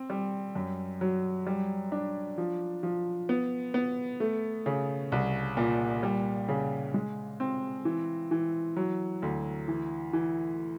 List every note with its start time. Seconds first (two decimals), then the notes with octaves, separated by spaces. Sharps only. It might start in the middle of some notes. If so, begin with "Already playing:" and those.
Already playing: C4
0.10 G3
0.55 F#2
1.01 F#3
1.47 G3
1.92 D4
2.38 F3
2.83 F3
3.29 B3
3.74 B3
4.20 A3
4.66 C#3
5.12 C2
5.57 A#2
6.03 G3
6.48 C#3
6.94 G#3
7.40 C4
7.85 E3
8.31 E3
8.76 F#3
9.22 D2
9.68 E3
10.13 E3